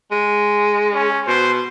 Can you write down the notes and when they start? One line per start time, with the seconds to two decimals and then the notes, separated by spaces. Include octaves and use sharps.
0.11 G#3
0.95 C#4
1.27 B2 C5